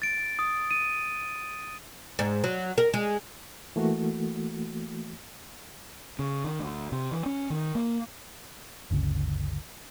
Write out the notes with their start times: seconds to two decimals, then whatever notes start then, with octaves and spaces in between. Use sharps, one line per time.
0.02 A6 D7
0.39 D#6
0.71 D#7
2.19 G#2
2.44 F#3
2.78 A#4
2.94 G#3
3.76 E3 A3 A#3 F#4
6.19 C#3
6.44 D#3
6.59 D2
6.92 C3
7.11 E3
7.26 C#4
7.50 D#3
7.75 A#3
8.91 G1 D2 C#3